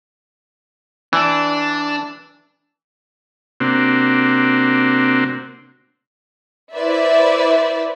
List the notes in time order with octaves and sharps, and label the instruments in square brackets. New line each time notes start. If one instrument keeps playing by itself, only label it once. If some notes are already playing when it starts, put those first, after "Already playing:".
[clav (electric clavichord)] E3 [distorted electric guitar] D4
[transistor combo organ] C3 A#3 C4 D4 F#4
[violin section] E4 B4 C5 D5 E5